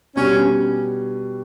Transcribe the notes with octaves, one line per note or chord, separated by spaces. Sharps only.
B2 G3 C#4 D4 G4